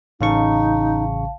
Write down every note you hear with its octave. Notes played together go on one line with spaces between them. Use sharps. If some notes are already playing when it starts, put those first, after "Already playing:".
A1 C#3 D#4 F5 A5 C#6